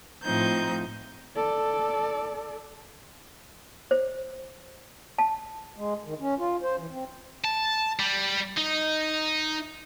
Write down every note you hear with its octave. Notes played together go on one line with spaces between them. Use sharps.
A2 F3 C4 D#4 G6
A4 D5
C5
A5
G#3
D#3
C#4
F4
C5
E3
C4
A5
G3
D#4